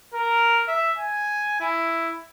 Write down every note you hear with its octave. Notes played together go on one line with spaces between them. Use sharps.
A#4
E5
G#5
E4